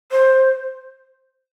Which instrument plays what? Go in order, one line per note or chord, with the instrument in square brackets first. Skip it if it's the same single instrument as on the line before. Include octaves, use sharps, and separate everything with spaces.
[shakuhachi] C5